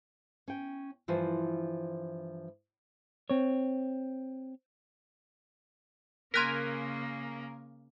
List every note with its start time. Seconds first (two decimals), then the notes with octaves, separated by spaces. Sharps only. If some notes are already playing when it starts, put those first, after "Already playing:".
0.48 C#4 G5
1.08 G2 E3 F3 F4 C5
3.30 C4 C#5
6.34 C#3 A#3 A#4 G#5 C6 F#6 B6